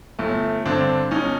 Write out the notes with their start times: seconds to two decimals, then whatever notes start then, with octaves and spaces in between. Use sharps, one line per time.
0.19 G1 A3
0.65 G2 D3 C4 D4
1.11 G1 C#4 D#4